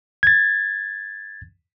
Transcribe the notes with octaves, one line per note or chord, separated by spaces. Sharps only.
G#6 A6